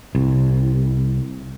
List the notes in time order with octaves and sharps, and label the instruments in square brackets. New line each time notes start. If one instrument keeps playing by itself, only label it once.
[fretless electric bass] C2